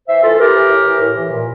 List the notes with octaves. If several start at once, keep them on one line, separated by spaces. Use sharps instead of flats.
E3 C5 E5
E3 F4 A4
E3 G4 A#4
E3
A2
E3
A2
E3
A#2